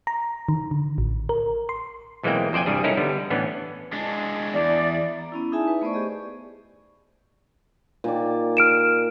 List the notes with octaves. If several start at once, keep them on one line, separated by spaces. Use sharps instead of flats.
A#5
D#3
D3
A1
A#4
C6
B1 E3 G#3 A#3 C4 G5
F2 C5 D5 G5 G#5
C2 G2 G3 G#4
C#4 D#4 E4 A4 A#4
D3 G3 B3
A2 E3 B3 C#4 D4
G#3 D4
E2 D5
A#5
B3 C#4 E4
D#4 E4 G#4 E5 G#5 A5
B4
A3 B3 C5 D5 C#6
G4 G#4 D#5
A#2 D#3 D5
F6 D7 E7